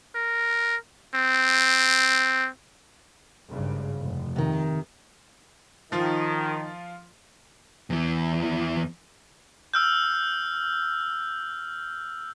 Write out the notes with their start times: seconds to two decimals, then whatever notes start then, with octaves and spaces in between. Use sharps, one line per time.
0.15 A#4
1.14 C4
3.51 G#1 G2 C#3
4.02 F1
4.36 C3 D#3
5.92 D#3 F3 F4
7.90 E2 E3
9.74 E6 F6 G6